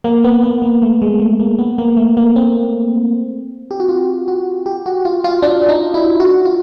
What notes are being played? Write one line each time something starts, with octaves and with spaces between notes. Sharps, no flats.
A#3
B3
B3
A#3
A3
G#3
A3
A#3
B3
A#3
A3
A#3
C4
G4
F#4
F4
F#4
G4
F#4
F4
F4
D4
D#4
E4
F#4
F4